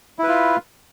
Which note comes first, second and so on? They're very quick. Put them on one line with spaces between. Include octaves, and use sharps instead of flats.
E4 B4 F4